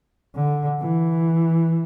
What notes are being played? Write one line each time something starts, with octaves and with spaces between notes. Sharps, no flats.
D3
E3